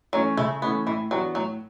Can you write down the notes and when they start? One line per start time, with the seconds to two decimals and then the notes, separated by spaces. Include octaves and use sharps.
0.13 E3 F#3 A3 C#4
0.37 C#3 A3
0.62 E3 A3 B3 C#4
0.86 A2 E3
1.11 E3 F#3 B3 D4 F#4
1.35 A2 F#3